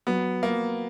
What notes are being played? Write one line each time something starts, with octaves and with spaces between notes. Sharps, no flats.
F#3 B3
F#3 A#3